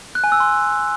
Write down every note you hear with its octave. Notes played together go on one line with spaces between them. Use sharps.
F#6
G#5
E6
C6